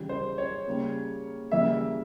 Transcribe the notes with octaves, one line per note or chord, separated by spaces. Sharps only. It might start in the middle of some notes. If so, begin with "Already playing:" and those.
Already playing: C#3 E3 G3
C5
C#5
C#3 G3 A#3
C#3 E3 G3 A#3 E5